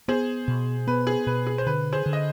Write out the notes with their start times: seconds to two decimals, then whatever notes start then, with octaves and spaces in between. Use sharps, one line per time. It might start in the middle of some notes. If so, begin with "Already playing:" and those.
0.08 B3 G#4 C5
0.48 B2
0.87 B3 B4
1.07 G#4
1.27 B2 B4
1.47 G#4
1.58 C5
1.66 D3 B4
1.93 G#4 C5
2.06 D3
2.13 D#5